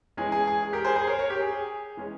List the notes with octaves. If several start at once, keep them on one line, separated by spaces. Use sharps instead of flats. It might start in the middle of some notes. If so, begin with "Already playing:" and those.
E3 G#3 C#4 G#4
G#4
G#4
G#4
G4 A#4
G#4 C5
G#4 C5
A#4 C#5
A#4 C#5
G4
G#4
G#4
E3 G#3 C#4